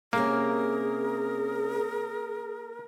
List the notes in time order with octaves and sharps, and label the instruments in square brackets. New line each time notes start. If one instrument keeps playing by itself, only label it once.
[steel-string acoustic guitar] C3 C#4 [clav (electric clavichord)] A#3 [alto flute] G#4 [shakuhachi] A#4